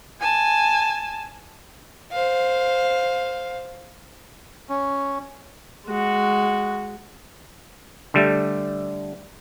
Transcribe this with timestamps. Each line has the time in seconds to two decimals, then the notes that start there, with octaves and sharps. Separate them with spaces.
0.20 G#5 A5
2.12 C5 F5
4.69 C#4
5.86 G#3 F#4
8.14 D3 G3 A3